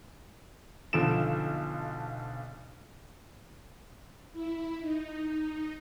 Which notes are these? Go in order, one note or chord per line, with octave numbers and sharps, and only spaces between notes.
B1 D3 F3 A4 D7 E7
E4
D#4